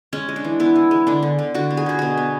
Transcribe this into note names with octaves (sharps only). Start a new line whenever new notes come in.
G#3 C#4
G#3
D4
E3
B3 E4
E3
G#3
D3 D4
D3
D3
D3 F#4
B3
G#4
D3 F#4
B2 G#4
B3